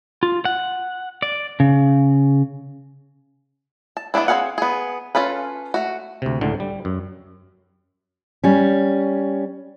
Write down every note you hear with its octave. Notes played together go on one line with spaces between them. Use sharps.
F4
F#5
D5
C#3
A5
E3 B3 C#4 D4 E4
C4 C#4 G#4 F5 F#5
B3 G#4
C#4 F4 A4 B4
A3 F#4
D2 C3
C#2 A2 D3
G3
F#2
G3 C#4